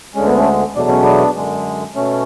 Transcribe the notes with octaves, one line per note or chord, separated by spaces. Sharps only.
D2 D3 G#3 C#4
B3
A3 C#4
E2 B2 F#3 A3 D4
C#4
B3 D4
F#2 D3 G#3
B2 A3 C#4